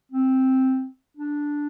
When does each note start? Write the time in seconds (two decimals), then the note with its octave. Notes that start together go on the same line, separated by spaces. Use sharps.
0.12 C4
1.17 D4